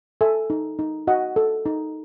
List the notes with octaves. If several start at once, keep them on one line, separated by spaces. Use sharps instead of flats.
A4 E5 G#5
D#4
D#4
F#4 D#5 F#5
A4
D#4